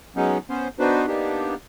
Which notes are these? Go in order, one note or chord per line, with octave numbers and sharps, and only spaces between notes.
F#3 G#3 B3 C#4 D#4
B3 C#4 C5
B3 D4 D#4 F#4 B4 C5
A#3 B3 D4 D#4 G4